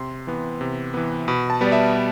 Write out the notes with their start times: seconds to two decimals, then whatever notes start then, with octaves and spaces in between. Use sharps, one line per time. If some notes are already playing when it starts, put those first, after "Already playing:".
Already playing: C3 C6
0.27 E3 B3
0.61 C3
0.94 E3 B3
1.28 B2 B5
1.50 A5
1.61 G3 B3
1.67 D5
1.72 E5
1.95 B2